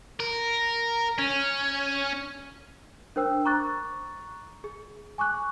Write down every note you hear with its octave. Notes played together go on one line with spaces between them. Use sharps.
A#4
C#4
D4 A#4 C5 G5 E6
A#5 C#6 D6 F#6 A6
G#4
G#5 C#6 D6 F#6